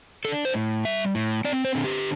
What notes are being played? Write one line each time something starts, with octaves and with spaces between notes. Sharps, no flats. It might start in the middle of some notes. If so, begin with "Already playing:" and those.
D4 A4
C5
A2
G3 E5
A2
C4 D5
C5
D3
G4